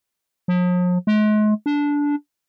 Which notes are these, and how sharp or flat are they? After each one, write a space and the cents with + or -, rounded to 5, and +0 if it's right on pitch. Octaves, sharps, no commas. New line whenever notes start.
F3 +45
G#3 +40
D4 -15